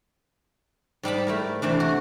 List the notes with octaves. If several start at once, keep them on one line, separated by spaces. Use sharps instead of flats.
G#2 G3 A5 B5
A3 E4 A#4
C3 E3 A3 D4
F#4